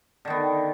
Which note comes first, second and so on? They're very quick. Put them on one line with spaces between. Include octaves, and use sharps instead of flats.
D3 D#3 B3